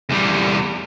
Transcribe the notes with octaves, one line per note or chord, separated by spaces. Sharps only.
E2 G3